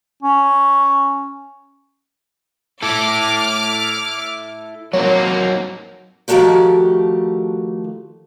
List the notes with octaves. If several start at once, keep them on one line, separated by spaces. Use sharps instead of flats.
C#4
E4 A4 D6 F6
F#3 A#3 C4 D#4 C#5
D#3 F3 G#3 A3 F#4 G4